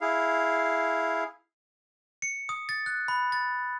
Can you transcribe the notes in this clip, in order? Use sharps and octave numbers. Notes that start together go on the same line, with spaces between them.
E4 G#4 F5
C#7
D#6
A6
F#6
B5
A6